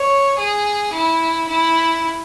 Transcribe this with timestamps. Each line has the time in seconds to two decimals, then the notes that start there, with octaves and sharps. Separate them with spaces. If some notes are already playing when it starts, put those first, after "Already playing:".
Already playing: C#5
0.38 G#4
0.93 E4
1.48 E4